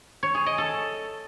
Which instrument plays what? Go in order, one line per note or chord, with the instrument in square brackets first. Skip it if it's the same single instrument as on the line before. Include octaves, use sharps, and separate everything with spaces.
[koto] C#5
G#4
D#5
A4